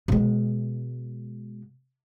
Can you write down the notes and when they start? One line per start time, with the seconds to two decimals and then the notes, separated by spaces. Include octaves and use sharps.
0.08 B2 G#3